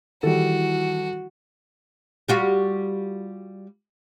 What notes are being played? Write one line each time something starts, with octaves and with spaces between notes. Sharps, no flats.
D#3 E3 G3 E4 F#4 A4
G3 F4 F#4